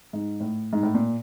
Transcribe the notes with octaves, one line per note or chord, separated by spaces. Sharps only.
G#2
A2
G#2
A2
A#2